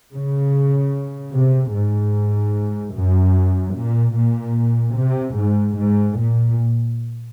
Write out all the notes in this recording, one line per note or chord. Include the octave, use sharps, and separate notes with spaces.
C#3
C3
G#2
F#2
A#2
A#2
C3
G#2
G#2
A#2